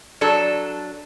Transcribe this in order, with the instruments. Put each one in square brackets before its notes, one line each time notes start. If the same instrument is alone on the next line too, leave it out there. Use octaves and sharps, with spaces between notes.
[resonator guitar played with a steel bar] F#3 D4 A4